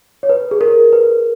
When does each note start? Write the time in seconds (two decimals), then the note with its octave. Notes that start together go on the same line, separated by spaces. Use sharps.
0.23 C#5
0.29 B4
0.51 G#4
0.61 A#4
0.93 B4